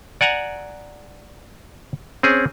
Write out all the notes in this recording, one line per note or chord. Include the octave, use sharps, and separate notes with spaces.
D5 F#5 G#5 A#5
C4 C#4 G#4